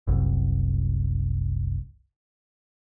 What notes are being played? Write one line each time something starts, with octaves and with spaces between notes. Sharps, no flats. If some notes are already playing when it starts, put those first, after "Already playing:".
F#1 C2